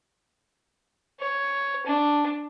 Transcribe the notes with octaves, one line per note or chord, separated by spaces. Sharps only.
C#5
D4